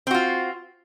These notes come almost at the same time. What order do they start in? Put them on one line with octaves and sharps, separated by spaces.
C4 F#4 F4